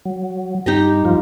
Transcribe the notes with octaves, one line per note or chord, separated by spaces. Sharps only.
F#3
G2 D#4 G4 D#5
G2 F3 F4